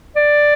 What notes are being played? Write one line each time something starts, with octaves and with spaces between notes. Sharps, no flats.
D5